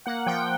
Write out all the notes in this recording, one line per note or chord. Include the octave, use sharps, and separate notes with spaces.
A#3 F#5
F3 G5